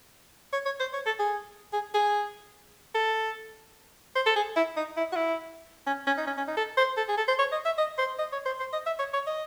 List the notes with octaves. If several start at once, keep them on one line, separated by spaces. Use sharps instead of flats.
C#5
C#5
C5
C#5
A4
G#4
G#4
G#4
A4
C5
A4
G#4
E4
D#4
E4
F#4
E4
C#4
C#4
D#4
C#4
C#4
D#4
A4
C5
A4
G#4
A4
C5
C#5
D#5
E5
D#5
C5
D#5
C#5
C5
C5
D#5
E5
C#5
C#5
D#5